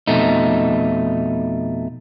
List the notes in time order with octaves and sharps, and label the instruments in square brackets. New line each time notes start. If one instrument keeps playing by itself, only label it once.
[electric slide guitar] F2 B2 A3 D#4